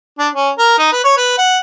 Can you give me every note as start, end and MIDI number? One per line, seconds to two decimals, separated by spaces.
0.18 0.28 62
0.34 0.50 61
0.58 0.76 70
0.78 0.88 63
0.92 1.01 71
1.04 1.16 73
1.17 1.33 71
1.38 1.58 78